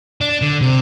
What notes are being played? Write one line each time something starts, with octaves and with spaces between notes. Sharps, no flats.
D4
D3
C3